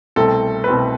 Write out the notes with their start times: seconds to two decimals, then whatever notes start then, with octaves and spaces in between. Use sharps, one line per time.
0.16 C2 B2 A3 C4 A4
0.64 B4
0.68 C2 B2 A3 C4 A4